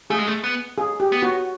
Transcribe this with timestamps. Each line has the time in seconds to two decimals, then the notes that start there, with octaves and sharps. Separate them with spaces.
0.10 A3 G#4
0.19 G#3
0.27 A3
0.44 B3
0.78 G#4
1.00 G4
1.12 B3
1.22 F#4